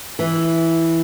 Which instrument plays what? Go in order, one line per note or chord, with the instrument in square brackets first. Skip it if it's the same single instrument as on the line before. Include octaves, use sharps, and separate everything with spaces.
[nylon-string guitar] E3